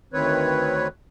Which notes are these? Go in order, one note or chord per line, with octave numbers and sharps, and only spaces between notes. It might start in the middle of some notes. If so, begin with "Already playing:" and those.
D2 D#3 C4 B4 C#5